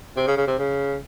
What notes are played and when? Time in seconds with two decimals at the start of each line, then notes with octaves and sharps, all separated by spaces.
0.17 C3
0.27 C#3
0.37 C#3
0.47 C3
0.58 C#3